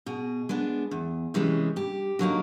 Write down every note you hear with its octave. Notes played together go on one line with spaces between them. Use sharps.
B2 G#4
G#3 B3 D4
E2
C3 E3 G#3 C#4
G2 G4
D3 F#3 A#3 D#4